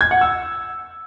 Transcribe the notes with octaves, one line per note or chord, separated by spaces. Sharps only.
G#6
F#5
E6